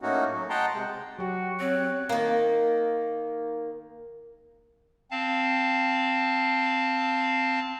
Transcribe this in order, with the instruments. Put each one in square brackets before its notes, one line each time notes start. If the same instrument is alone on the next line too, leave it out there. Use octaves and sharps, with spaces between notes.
[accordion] A2 A3 A#3 C#4 D#4 F#4
F#3
D#5 F#5 G5 A5 A#5 C6
C3 G#3
[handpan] F#3 G4 [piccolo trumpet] F#4
[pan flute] C4 [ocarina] C#5 [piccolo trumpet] F#6
[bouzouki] D#3 A#3
[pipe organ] C4 F5 A5